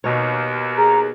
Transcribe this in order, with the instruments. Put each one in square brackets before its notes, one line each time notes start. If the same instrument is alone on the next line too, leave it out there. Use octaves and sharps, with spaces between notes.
[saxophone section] D#2 [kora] B2 C#5
[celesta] G#4 [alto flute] A#5